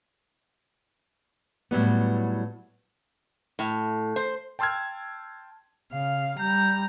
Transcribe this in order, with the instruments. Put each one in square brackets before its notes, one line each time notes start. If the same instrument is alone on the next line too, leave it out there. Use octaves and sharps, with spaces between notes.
[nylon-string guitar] A2 F#3 G3 B3
[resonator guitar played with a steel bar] A2
C5
[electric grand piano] G5 A5 C6 E6 F6 G#6
[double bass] C#3 [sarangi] F5
[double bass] G3 [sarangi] A#5 [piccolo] G6